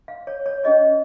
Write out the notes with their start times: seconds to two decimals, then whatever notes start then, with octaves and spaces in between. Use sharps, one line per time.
0.08 F5
0.27 C#5
0.46 C#5
0.64 C#4 G#4 C#5 D#5